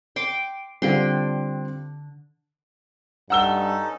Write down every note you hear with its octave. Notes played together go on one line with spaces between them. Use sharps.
G5 C6 D6
D3 G3 C4 F4 G5 C6
G2 C#4 D#4 A4 F#5 E6 G7